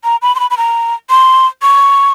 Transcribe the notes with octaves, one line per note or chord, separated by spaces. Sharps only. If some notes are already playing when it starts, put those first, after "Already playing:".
A#5
B5
C6
B5
B5
A#5
C6
C#6